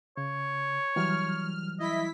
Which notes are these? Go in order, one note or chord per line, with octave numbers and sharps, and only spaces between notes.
C#3 C#5
E3 F#3 G3 F6
E4 D#5 B6